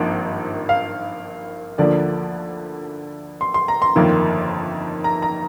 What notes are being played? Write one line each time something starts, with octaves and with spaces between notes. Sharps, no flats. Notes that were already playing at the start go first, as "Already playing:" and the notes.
Already playing: G#1 G2 F3 A#3
F5
D2 D3 F3 A#3 D5
C6
C6
A#5
C6
G1 F2 D#3 A#3
A#5
A#5